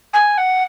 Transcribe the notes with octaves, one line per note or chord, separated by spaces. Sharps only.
G#5
F#5